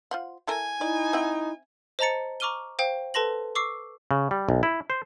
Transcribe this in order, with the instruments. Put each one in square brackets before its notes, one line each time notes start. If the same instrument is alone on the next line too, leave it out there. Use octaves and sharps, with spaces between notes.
[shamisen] F4 C5 F#5
[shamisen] E4 A4 A#4 [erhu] G#5
[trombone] D#4 [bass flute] E4 [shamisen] D5
[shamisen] C4 E5 F#5
[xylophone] C5 D#5 A5 A#5 A6 C#7
A#5 C#6 D6 F6 D#7 G7
C5 F5 G5
A4 B4 A5 C6 A#6 F#7
C#6 D6 E6 C7
[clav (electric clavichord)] C#3
G3
B1
E4
C5